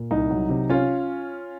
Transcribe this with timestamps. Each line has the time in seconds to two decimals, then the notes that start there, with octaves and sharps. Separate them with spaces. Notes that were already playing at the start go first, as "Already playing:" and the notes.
Already playing: A#2
0.11 C2 D#4
0.30 F#3
0.49 C3
0.70 C#4 F4